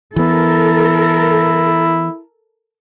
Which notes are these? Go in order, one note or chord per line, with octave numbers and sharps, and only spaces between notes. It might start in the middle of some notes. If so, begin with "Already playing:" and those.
E3 B3 E4 A4 A#4